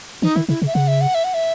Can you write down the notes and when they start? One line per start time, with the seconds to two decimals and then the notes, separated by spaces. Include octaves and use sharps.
0.22 E3 D#4
0.36 D#3 E4
0.48 C#3 E4
0.62 C#3
0.67 E5
0.74 C#3 F#5
0.88 E5
1.01 F#5
1.15 E5
1.24 F#5
1.34 E5